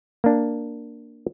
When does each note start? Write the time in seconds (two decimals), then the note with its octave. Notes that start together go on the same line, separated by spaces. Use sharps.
0.24 A#3 D4